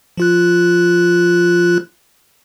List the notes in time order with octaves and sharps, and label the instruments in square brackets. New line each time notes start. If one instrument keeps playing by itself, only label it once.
[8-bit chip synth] F3 F4 F#6